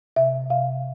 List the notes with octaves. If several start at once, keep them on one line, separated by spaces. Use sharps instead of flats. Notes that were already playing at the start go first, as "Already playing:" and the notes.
C3 E5
C3 F5